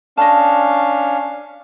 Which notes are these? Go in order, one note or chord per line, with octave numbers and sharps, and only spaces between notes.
C#4 D4 D#5 F5 A5